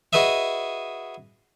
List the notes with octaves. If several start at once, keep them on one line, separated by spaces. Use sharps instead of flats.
F#4 G#4 B4 D#5 E5